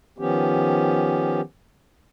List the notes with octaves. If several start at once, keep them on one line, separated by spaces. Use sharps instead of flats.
D#3 F3 B3 C#4 G4